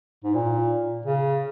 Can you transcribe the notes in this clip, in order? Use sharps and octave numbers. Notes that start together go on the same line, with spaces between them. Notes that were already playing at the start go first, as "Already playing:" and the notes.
G#2
A#2
C#3